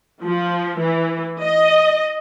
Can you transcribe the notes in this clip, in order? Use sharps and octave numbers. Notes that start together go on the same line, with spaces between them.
F3
E3
D#5